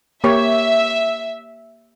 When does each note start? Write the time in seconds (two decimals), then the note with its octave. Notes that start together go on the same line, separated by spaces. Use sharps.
0.24 A#3 G4 C#5 E5